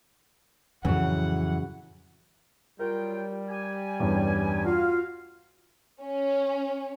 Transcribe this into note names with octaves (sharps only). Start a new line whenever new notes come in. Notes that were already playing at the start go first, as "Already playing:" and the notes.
F2 A2 C#3 E3 F#3 F#5
F#3 G3 F4 A#4 G5
G4 G#5
E2 G2 C#4
F4 F#4 F5
C#4